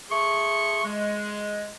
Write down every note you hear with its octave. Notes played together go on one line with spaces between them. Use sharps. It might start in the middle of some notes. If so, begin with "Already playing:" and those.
A3 G#4 C6 C#6
G#3